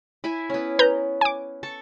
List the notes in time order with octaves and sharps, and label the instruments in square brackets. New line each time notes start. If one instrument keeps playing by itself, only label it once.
[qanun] E4 E5 G#5
B3 C#4
[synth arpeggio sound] B4 A#5 G6
G#5 D6
[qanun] A4 A5 C#6